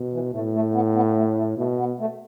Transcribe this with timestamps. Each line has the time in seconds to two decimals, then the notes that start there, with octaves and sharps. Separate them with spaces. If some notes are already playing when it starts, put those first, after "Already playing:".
Already playing: B2
0.13 E3
0.33 A2 A3
0.54 A3
0.74 B3
0.95 B3
1.16 A3
1.37 A3
1.57 B2 A3
1.78 B3
2.00 A3